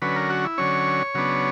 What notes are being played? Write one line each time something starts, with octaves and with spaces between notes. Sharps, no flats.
D3 F#3 C#4 B4
A#4
F#4
E4
D3 F#3 C#4 C#5
C#3 F#3 B3 D4